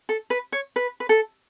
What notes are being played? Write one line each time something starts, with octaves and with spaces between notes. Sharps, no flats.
A4
B4
C#5
B4
B4
A4